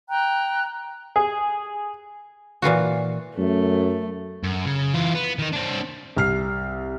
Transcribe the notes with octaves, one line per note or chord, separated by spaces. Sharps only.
G5 A#5 F#6
G#4
A#2 E3 F4 F#4
F#2 A3
F#2
C#3
E3 F4
B3
D#3 D#4
C4 D4
C2 F6 C7